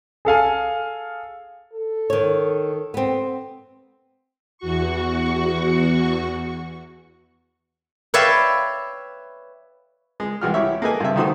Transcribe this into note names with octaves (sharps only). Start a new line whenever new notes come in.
G#4 A4 F5 G#5
A4
D#3 C#5
B3 C4
E2 F#4 C#6
B4 C#5 D5 E5 F5 G5
G#3
C2 E3 G#3 F#4 G5 F6
E4 G4 C#5 E5
A#3 G#4 A4 B4 D#5 G#5
G2 C3 E5
D#3 A3 D#4 F#4 C5 D#6